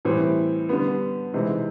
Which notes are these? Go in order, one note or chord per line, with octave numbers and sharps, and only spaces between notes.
A2 E3 G3 C4
D3 G3 B3
C3 E3 G#3 C4 D#4